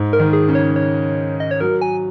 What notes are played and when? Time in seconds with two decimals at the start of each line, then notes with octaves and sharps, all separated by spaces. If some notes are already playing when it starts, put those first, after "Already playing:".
Already playing: G#2
0.13 A#4
0.19 D#3
0.33 G#4
0.48 C#3
0.55 C#5
0.76 C#5
1.40 D#5
1.51 C#5
1.61 F#3 A#4
1.82 G#5